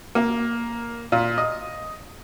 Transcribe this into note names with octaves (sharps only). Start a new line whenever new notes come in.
A#3
A#2
D#5